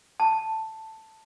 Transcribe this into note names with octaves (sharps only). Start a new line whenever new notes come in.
A5